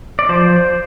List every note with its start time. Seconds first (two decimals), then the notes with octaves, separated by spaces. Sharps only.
0.19 D5
0.29 F3 C5